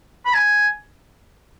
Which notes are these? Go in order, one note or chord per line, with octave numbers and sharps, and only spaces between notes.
B5
G#5